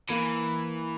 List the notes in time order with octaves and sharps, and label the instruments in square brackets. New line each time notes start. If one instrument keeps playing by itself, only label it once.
[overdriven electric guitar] E3 [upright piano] A#3